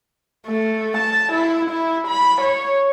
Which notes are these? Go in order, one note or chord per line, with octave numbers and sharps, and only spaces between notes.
A3
A5
E4
E4
B5
C#5